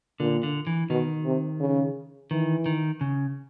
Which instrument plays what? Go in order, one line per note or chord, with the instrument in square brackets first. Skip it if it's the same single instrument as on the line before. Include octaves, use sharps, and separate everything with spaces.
[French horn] A#2 [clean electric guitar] D3
[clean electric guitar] D3
E3
[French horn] B2 [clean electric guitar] D#3
[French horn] C3
C#3
[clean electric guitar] D#3 [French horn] E3
[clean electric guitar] D#3
C#3